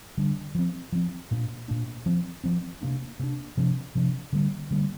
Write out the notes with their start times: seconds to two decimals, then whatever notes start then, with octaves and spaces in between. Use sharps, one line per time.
0.17 D3 G3 D4
0.55 F3 C4
0.92 F3 C4
1.31 A#2 A#3 D4
1.68 A#2 A#3 D4
2.06 F3 C4
2.44 F3 C4
2.81 C3 A#3 D4
3.19 C3 A#3 D4
3.57 C3 F3 D4
3.95 C3 F3 D4
4.33 D3 G3 A#3
4.71 D3 G3 A#3